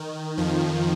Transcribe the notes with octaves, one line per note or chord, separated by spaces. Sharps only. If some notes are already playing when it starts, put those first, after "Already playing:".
Already playing: D#3
F2 F3